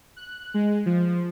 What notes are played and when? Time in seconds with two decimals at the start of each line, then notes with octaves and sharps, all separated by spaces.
0.16 F#6
0.54 G#3
0.86 F3